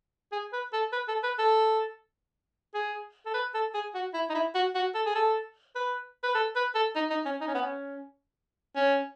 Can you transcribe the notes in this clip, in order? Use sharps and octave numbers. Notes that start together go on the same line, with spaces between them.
G#4
B4
A4
B4
A4
B4
A4
G#4
A4
B4
A4
G#4
F#4
E4
D#4
E4
F#4
F#4
A4
G#4
A4
B4
B4
A4
B4
A4
D#4
D#4
C#4
D#4
C#4
B3
C#4
C#4